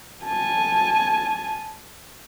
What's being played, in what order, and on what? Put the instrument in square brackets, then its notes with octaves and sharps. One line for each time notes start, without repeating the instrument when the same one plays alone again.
[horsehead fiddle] G#5 A5